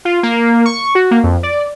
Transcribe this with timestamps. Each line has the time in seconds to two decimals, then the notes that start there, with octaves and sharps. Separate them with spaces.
0.05 F4
0.23 A#3
0.65 C#6
0.95 F#4
1.11 A#3
1.24 F2
1.43 D5